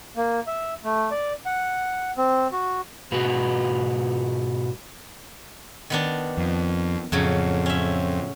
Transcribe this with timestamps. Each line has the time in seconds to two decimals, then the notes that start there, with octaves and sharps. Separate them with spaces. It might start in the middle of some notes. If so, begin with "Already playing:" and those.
0.17 A#3
0.47 E5
0.84 A3
1.11 D5
1.46 F#5
2.17 C4
2.52 F#4
3.12 G#2 B2 F#4 B4
5.90 D#3 B3 D4
6.37 F2
7.12 F2 A2 C#3 F#3
7.66 C#4 E5